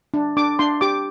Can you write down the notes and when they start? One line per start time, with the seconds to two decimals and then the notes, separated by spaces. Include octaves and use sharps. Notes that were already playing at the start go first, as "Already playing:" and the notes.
0.14 D4
0.37 D4 D6
0.59 D4 C6
0.81 G4 D6